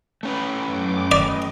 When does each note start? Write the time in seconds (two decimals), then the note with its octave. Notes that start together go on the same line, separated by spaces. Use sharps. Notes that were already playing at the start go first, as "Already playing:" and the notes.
0.23 A3 C#4 B4
0.65 F#2 D6
1.12 D5 D#5